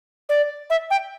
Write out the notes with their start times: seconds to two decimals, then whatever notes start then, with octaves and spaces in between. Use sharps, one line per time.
0.29 D5
0.70 E5
0.90 G5